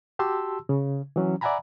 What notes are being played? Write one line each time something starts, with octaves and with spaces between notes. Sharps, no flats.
F#4 G4 A5 C6 E6
C#3
E3 F#3 C#4
D5 E5 F#5 G#5 A#5 B5